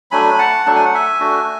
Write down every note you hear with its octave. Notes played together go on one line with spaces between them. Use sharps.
F#3 A3 D4 G#5 B5
F#5 A5
F#3 A3 D4 A5
G#5
F#5
E5 G#5
A3 D4 F#4